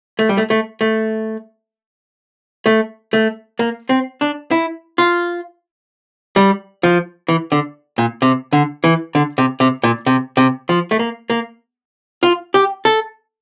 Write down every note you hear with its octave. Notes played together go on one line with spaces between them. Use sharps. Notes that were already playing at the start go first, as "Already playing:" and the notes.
A3
G3
A3
A3
A3
A3
A3
A#3
C4
D4
E4
F4
G3
F3
E3
D3
A#2
C3
D3
E3
D3
C3
C3
A#2
C3
C3
F3
A3
A#3
A#3
F4
G4
A4